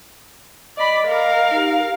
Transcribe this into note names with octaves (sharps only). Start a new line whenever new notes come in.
D5 D#5 B5
A#4 F5
D#4 G4